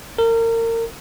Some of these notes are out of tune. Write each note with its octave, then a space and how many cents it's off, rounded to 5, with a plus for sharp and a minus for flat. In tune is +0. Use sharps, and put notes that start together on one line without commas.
A#4 -30